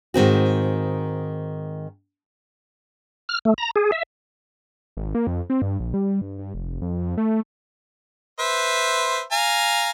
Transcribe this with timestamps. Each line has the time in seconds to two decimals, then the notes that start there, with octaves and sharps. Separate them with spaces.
0.14 G#2 D#3 C4 F#4
3.29 F6
3.45 A3
3.58 A#5
3.76 G#4
3.92 E5
4.97 G#1
5.15 A#3
5.27 F2
5.50 C4
5.62 G2
5.80 A#1
5.94 G3
6.21 G2
6.39 G2
6.54 F1
6.82 F2
7.18 A3
8.39 B4 C5 E5
9.32 F5 G#5 A#5